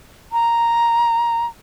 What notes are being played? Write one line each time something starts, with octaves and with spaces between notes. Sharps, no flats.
A#5